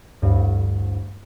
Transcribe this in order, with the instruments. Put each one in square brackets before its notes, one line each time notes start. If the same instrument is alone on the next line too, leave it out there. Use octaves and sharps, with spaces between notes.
[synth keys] A1 D2 G2